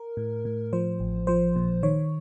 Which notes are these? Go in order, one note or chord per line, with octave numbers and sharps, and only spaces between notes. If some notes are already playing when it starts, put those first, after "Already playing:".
Already playing: A#4
A2
A2
F3 C5
A1
F3 C5
A#2
D#3 C#5